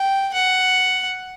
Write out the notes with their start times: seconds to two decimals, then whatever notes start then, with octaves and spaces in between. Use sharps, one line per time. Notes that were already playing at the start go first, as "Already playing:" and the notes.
Already playing: G5
0.34 F#5